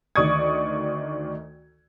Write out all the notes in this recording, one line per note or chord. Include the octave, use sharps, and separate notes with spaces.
D2 D#3 D5 C#6 D#6 G#6